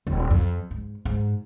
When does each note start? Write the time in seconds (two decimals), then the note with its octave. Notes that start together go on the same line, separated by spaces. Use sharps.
0.07 D#1
0.31 F2
0.71 G#2
1.05 G#2